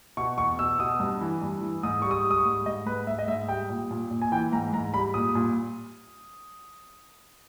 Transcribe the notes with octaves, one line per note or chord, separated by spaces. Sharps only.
B2 C#6
E2 C#6
B2 E6
B2 D#6
G2
E3
G2
E3
G#2 D#6
G3 C#6
D#6
G3
D#6
C#6
G#2
G#2 D#5
G#2 B4
G#2 E5
D#5
G#2 E5
G3 G5
A#2
A#2
A#2
G#5
E3 G5
G#2 A#5
G#2 A#5
G3 B5
A#2 D#6
A#2